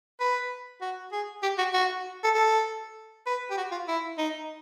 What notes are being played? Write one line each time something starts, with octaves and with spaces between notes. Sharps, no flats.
B4
F#4
G#4
G4
F#4
F#4
A4
A4
B4
G4
F#4
F4
E4
D#4